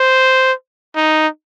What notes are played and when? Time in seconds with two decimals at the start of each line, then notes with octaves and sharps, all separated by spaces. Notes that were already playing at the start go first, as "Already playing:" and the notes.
Already playing: C5
0.95 D#4